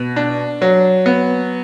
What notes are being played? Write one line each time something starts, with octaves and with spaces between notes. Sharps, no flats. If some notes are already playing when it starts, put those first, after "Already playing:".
Already playing: B2
D4
F#3
B3